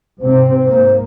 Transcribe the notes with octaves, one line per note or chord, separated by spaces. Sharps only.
G#2 C3 C4 C5
G#2 A#3 C5